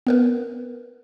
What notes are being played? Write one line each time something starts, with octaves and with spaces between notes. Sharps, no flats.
B3 A#4 B4